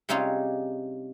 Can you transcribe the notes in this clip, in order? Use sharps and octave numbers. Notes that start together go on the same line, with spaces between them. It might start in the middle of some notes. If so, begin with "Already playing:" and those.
C3 G3 C#4 D#4 F4 G#4